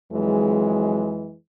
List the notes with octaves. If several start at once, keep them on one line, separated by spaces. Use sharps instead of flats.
F2 E3 F#3 G#3